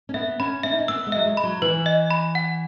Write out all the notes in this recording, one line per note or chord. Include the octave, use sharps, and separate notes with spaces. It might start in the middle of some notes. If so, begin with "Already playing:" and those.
C#4
B3 E5
C#4 B5
C#4 E5
D#4
C#4
B3 E6
G#3
F#3 E5
G#3
B5
F#3
E3 B4
D#5
B5
F#5